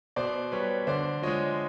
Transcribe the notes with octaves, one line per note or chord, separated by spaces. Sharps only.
B2 C5 D5
G3 B4 C#5
D3 C5 D5
F3 G#3 C#5 D#5